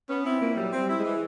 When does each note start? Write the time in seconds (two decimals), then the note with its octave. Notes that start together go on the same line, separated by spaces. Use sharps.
0.08 B3 C#4
0.25 C4 E4
0.41 A#2 A#3
0.56 F#3 G3
0.72 C4
0.78 G3
0.89 E4
0.99 G#3
1.04 E3